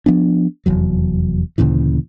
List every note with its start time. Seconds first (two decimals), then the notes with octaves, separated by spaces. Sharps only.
0.06 F3 B3 D4
0.66 F1 E2 F#3
1.58 D2 A#2 C#3 E3